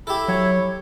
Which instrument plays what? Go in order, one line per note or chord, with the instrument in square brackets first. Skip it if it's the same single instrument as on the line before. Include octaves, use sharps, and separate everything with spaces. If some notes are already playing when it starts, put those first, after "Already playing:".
[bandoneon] E4 [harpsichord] G4 A4
[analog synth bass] F#3 [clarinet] C#5